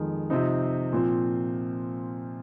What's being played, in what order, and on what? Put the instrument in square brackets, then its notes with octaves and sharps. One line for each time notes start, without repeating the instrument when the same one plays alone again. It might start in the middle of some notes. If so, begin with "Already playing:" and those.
Already playing: [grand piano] F2 D#3 G#3
C3 F3 C4 D#4
A#2 F3 C4